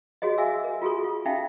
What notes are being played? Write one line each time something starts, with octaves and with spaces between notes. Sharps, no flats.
F#4 G#4 C#5 D#5
E5 F5 G#5 D6 E6
A#4
F4 F#4 G#4 A4 C#6
F4
C#4 D#4 E5 F5 G5 A5